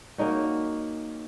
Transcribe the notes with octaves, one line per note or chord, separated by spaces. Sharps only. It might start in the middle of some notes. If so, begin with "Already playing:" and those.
A#3 C#4 D#4 F#4